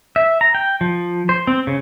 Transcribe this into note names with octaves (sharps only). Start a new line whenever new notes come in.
E5
A#5
G5
F3
C5
C4
C#3